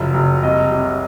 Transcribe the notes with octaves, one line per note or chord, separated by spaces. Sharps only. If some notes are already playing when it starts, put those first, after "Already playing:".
Already playing: F#1 F3 E5
F#1
C2 D#5
C3